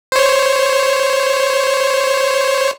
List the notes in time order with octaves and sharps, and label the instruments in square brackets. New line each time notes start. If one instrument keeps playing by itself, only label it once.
[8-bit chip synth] C5 C#5